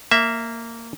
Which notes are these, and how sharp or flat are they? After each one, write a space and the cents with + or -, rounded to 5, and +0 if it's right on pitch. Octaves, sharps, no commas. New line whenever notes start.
A#3 -15 E5 +0